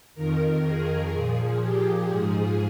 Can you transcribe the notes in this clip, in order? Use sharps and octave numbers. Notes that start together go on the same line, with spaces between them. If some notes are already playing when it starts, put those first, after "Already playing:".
F2 D#3 A#4
G#4
A#2 F3
G4
G#2 F3 G#4